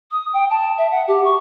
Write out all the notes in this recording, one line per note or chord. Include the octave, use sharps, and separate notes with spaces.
D#6
G5
A5
E5
F#5
G4
C#6